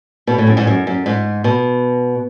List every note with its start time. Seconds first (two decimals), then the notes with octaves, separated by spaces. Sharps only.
0.27 B2
0.38 A2
0.47 F#2
0.57 G#2
0.67 F#2
0.87 F#2
1.06 G#2
1.44 B2